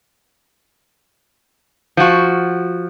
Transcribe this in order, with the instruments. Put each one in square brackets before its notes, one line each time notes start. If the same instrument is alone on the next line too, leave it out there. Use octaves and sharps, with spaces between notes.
[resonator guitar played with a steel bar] F3 F#4